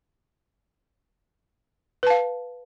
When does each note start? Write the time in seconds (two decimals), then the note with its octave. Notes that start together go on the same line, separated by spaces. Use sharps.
2.03 B4
2.07 A5
2.10 F5